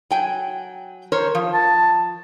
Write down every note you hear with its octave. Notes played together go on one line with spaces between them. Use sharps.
F#3 G5 G#5
A#4 C5 C#5
F3
A5